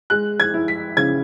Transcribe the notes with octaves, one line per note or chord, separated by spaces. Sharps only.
G#3 F#6
G#6
E4
B6
C#3 G#6